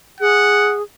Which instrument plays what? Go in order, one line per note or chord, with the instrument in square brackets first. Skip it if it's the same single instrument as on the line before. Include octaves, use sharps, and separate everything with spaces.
[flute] G#4 [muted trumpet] F#5